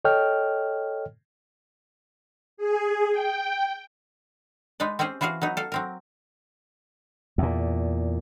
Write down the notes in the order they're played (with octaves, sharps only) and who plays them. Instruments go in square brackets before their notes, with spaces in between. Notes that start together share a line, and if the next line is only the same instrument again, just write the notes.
[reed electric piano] A4 C#5 D#5 G5 F6
[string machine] G#4
G5
[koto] G#3 D#4 B4 D5
C4 C#4 G4 G#4 C5
E3 F4 F#4 G#4 F5
F#3 B3 D#4
A4 F5
F#3 C4 A#4
[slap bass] E2 A#2